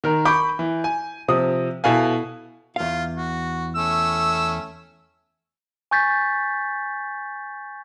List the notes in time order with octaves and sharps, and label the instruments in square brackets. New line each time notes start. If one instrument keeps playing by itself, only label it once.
[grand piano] D#3 A#4
B5 C#6 D6 G6 D7
E3
G#5
C3 F3 D#6
B2 E4 A4 F5 G#5
[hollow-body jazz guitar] E2 F5 [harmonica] F4
[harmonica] F#4
A3 C#4 E6
[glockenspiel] G#5 C#6 G6 A6 B6